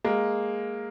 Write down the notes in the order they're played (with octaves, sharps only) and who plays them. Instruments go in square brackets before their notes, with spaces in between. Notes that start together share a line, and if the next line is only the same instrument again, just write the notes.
[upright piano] G#3 A#3